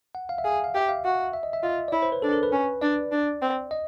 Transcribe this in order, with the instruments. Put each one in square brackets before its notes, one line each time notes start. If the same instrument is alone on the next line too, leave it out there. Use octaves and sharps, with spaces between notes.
[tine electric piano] F#5
F5
E5
[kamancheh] G#4 [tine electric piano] F5
[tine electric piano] F5
[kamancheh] G4 [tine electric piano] E5
[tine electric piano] F5
[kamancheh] F#4
[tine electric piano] E5
D#5
E5
[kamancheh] F4 [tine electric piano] D#5
[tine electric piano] D5
[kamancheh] E4 [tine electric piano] C#5
[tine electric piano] C5
B4
[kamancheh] D4 [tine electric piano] A4
[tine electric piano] A#4
B4
[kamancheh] C#4
[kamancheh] D4 [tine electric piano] D5
[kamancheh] D4
C4
[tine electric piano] D#5